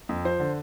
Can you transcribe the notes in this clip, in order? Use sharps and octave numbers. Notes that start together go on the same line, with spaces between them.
F2
F3 C5
D3